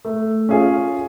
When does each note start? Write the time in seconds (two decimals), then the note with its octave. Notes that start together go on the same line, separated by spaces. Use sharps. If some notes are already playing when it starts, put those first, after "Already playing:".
0.05 A3
0.49 C#4 F4 G#4 C#5